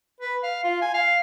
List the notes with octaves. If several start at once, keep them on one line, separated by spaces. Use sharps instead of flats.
B4
F5
F4
G#5
F5